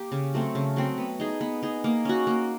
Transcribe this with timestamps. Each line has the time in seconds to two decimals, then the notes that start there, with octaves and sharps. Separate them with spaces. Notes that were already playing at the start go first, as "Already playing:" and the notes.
Already playing: A#3 G4
0.12 C#3
0.34 F#3 A3 C4
0.55 C#3
0.76 F#3 A3 C4
0.98 B3
1.20 D#4 G#4
1.41 B3
1.63 D#4 G#4
1.84 A#3
2.05 C#4 F#4
2.27 A#3